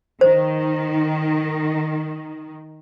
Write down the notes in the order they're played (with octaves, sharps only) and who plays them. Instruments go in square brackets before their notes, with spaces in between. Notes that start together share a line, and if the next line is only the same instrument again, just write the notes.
[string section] D#3 [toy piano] C5